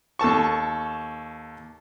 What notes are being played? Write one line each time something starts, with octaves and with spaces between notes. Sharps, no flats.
D#2 A4 A5 C#6